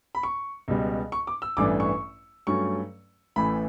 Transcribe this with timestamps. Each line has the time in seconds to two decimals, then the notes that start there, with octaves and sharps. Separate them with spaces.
0.15 B5
0.23 C#6
0.68 C#2 B2 G3
1.12 C#6
1.27 D6
1.42 E6
1.57 A1 G2 E3 A3 D4 D6
1.80 C#6
2.47 G2 F#3 A3 C#4 C#6
3.36 A1 A2 E3 A3 B5